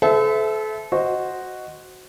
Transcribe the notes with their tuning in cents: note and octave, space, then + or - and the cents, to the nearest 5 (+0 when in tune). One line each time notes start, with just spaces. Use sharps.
A4 -30 C5 -45 E5 +0
F#4 +0 C5 +0 D#5 +0